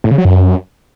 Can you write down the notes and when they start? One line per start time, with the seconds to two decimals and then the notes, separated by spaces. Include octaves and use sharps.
0.04 A2
0.11 C#3
0.18 F#3
0.25 F#2